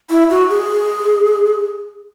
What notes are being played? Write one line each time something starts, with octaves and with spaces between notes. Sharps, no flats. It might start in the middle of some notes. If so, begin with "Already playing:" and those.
E4
F#4
G#4